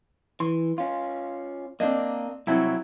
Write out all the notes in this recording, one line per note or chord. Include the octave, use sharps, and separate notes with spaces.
E3 C6
C#4 F4
A#3 C4 D4 D#5
C2 C3 F#3 C4 E4 F#4